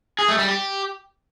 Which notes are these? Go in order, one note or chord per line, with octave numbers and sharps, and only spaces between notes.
G#4
A3
G3
G4